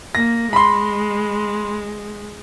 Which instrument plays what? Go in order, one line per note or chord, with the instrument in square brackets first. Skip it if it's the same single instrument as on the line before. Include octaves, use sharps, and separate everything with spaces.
[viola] A#3 [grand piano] A#6
[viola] G#3 [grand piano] B5 C6